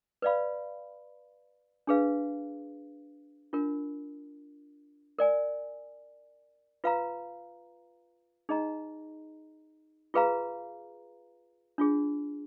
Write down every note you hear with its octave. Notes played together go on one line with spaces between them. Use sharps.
B4 D5 F5 B5
D4 G#4 B4 F5
D4 F4 A#4
A#4 D5 G#5
F4 B4 F5 A#5
D#4 G#4 D#5 A#5
F4 G#4 B4 F5 A#5
D4 F4 G#4